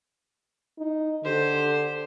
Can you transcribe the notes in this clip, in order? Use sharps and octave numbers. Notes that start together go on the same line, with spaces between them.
D#4
D3 G4 C5